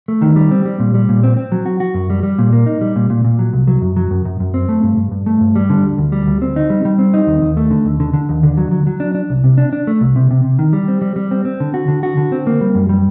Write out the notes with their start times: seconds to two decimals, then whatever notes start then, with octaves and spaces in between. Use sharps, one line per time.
0.08 A3
0.22 D#3
0.36 G3
0.51 C4
0.65 G3
0.79 A#2
0.94 G3
1.09 A#2
1.23 C4
1.37 C4
1.52 F#3
1.66 F#4
1.80 F#4
1.94 F#2
2.10 G3
2.23 G3
2.38 A#2
2.53 A#3
2.66 D#4
2.81 G3
2.96 A#2
3.10 A#2
3.25 A#2
3.39 F#3
3.53 C2
3.67 F#3
3.82 F#2
3.97 F#3
4.11 F#2
4.25 F#2
4.40 F#2
4.54 C4
4.69 A3
4.83 G2
4.97 G2
5.12 G2
5.26 A3
5.41 G2
5.56 G3
5.70 D3
5.84 D2
5.98 D2
6.12 G3
6.26 D2
6.42 C4
6.56 D#4
6.70 G3
6.85 G3
6.99 C4
7.14 D#4
7.27 D#2
7.42 D#2
7.57 A3
7.71 D3
7.85 D#2
8.00 D3
8.14 D3
8.29 D#2
8.43 D3
8.57 F#3
8.71 F#3
8.87 F#3
9.00 D4
9.15 D4
9.30 C2
9.44 C3
9.58 D4
9.73 D4
9.87 A3
10.01 C2
10.16 C3
10.31 C3
10.44 C3
10.59 D#3
10.73 G3
10.88 C4
11.02 G3
11.16 G3
11.31 C4
11.45 C4
11.60 D3
11.74 F#4
11.88 D3
12.03 F#4
12.17 D3
12.32 C4
12.47 A#3
12.61 G3
12.75 F#2
12.89 G3